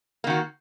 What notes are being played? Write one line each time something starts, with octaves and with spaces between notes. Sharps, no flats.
D#3 A#3 F#4